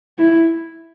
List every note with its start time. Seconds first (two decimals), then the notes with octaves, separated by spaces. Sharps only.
0.18 E4